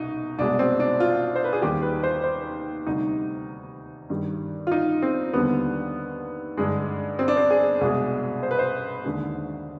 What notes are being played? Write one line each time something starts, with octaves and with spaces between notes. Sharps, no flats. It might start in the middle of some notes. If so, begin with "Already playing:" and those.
Already playing: C2 B2 D#4
C2 B2 G#3 D4
C4
D4
F4
C5
B4
G#4
D#2 D#3 G3 G4
B4
C5
C5
D2 C3 G3 D#4
G2 D#3 G3
F4
D#4
C4
D#2 D3 G3 B3
G2 D3 G#3
C4
D4
C4
G#4
C2 B2 G#3 G#4
C5
B4
C5
D#2 D3 G#3